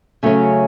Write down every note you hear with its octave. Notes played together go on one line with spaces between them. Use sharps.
C#3 F#3 A3 C#4 F#4